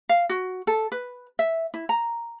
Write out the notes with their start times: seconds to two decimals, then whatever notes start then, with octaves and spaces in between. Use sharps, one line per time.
0.09 F5
0.29 F#4
0.67 A4
0.92 B4
1.39 E5
1.74 E4
1.89 A#5